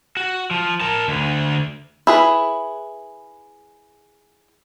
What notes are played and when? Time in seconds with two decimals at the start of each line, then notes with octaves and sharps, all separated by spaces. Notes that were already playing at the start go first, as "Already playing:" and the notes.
0.17 F#4
0.51 F3
0.81 A#4 A5
1.08 D2 D3
2.07 E4 G#4 B4